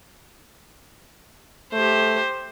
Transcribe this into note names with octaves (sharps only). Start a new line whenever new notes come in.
A3 G4 C5